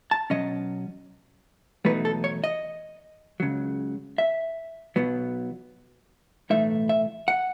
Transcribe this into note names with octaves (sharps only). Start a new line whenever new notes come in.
A5
B2 F#3 C#4 D#5
E2 B2 F#3 A3 D#4 B4
A4
C#5
D#5
C#2 C#3 F#3
E5
B1 B2 F#3 B3
B1 A2 E3 A3 D#4 E5
E5
F#5